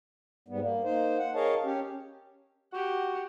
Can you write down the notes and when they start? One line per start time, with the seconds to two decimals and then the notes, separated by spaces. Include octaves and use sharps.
0.48 G#2 G3 B3
0.61 A#3
0.84 A#3 D#4 C5
1.18 F#5
1.35 G#4 A#4 C#5 D#5 F5 A5
1.64 C#4 G4
2.73 F#4 G4 F#5